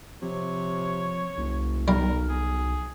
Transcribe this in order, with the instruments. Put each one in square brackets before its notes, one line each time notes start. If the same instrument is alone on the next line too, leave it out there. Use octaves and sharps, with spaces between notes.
[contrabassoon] C3 [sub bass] F3 [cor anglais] C#5
[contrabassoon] F#1 [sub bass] C2
[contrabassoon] B1 [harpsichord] G3 [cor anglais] A#4
[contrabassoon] B1 [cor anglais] G#4